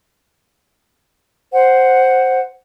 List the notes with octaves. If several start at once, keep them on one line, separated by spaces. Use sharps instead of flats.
C5 F#5